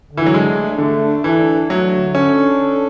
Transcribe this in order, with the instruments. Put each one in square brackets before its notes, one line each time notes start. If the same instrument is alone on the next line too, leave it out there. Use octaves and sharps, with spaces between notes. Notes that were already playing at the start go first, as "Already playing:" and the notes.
[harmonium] D3
[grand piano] E3
F#3
[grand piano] G#3 [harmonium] D4
[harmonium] A3
[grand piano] D3 [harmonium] A3
[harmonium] D4
[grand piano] E3 [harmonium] A4
[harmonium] D4
[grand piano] F#3 [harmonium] A3
[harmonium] D3
[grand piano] C#4 [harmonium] A4
[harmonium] D4
A4